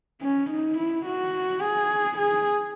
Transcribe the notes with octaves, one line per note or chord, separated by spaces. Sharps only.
C#4
D#4
E4
F#4
G#4
G#4